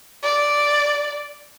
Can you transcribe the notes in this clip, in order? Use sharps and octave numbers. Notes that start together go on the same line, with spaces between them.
D5